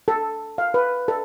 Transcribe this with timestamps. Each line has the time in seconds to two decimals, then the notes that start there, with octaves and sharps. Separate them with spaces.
0.08 A4
0.58 F5
0.74 B4
1.08 A4